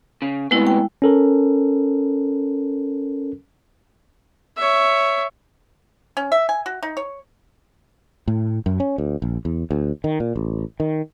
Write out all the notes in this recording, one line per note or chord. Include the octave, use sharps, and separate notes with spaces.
C#3
A2 C3 G#3 B3 E4
G5
C#4 A4 A#4
C#5 E5
C#4
E5
G#5
F#4
D#4
C#5
A2
F#2
C#4
D2
A#1
E2
D2
D#3
A#2
A1
D#3